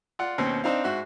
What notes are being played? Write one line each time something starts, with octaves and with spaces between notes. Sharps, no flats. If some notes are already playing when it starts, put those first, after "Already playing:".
F4 D5 F#5
D#2 B2 C4 C#4 C5
C4 D4 D#4 C5 F5
G#2 F#4 C5 E5 F#6